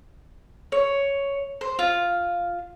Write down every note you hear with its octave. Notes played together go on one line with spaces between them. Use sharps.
C#5
C5
F4